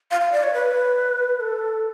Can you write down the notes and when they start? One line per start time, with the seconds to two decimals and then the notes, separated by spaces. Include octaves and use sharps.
0.11 F5
0.21 F5
0.32 D5
0.43 C#5
0.54 B4
1.40 A4